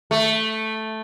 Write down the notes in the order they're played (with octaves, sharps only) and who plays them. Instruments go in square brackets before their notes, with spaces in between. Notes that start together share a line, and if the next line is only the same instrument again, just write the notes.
[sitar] A3